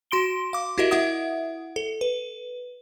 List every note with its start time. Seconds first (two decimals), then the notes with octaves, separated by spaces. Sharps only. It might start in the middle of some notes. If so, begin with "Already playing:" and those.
0.11 F#4 C6 D7 G7
0.53 F5 D6
0.78 E4 F#4 G4 A#4 D#5 E5
0.91 E4 E5 F#5 D#6
1.76 A4
2.01 B4